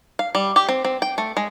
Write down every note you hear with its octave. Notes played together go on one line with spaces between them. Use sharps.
F5
G3
G4
C4
C4
G5
A3
G#3